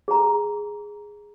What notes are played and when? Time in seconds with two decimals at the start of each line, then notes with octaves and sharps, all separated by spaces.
0.08 G#4 A#5